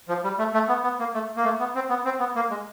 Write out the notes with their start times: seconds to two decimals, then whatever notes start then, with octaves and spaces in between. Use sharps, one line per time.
0.09 F3
0.24 G3
0.39 A3
0.54 A3
0.69 B3
0.83 B3
0.99 A#3
1.14 A3
1.37 A#3
1.45 A3
1.60 B3
1.75 C4
1.90 B3
2.05 C4
2.20 B3
2.36 A#3
2.50 G#3